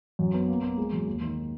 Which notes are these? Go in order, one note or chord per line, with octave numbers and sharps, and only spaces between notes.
F#2
B3
A#3
A#3
G#3
F#2
D#2
D#3